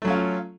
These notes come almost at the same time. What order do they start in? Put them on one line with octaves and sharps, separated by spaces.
A3 F#3 C#4 F4